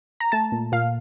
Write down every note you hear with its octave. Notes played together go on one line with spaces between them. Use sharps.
A#5
A3 A5
A#2
A#2 F5